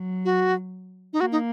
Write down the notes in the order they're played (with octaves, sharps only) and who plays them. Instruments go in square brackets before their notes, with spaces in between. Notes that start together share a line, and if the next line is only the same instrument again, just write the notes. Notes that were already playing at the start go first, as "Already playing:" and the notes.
Already playing: [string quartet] F#3
[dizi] F#4
D#4
[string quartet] A#3 [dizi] F#4
[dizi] D#4